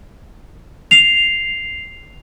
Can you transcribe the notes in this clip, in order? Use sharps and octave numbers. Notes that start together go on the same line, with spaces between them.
C7 F7